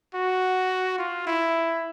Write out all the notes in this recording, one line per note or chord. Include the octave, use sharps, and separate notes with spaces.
F#4
F4
E4